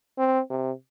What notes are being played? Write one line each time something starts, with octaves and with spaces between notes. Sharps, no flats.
C4
C3